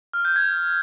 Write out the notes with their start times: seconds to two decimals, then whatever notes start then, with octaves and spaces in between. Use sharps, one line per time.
0.13 F6
0.25 G6
0.36 G#6